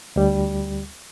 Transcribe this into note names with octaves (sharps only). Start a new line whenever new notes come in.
D2 G3